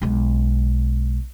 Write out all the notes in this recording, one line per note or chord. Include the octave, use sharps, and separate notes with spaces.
B1 G#3